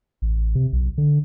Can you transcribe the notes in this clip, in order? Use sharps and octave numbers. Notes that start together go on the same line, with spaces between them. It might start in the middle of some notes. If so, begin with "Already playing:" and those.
A1
C3
B1
D3